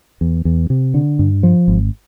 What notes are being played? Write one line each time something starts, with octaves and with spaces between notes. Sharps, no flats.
E2
E2
C3
D3
G2
F3
G#1